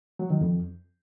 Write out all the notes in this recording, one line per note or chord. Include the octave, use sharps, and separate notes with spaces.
F#3
D#3
F2